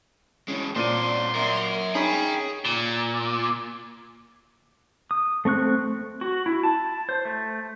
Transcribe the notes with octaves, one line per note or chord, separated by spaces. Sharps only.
E3 G#3 C#4
A#2 C4 D4 C6 D#7
F#2 A#4
C#4 D#4 G#4 G5 B5 B6
A#2
D#6
A3 C4 C#6 F#6
F#4
E4
A5
C5
A3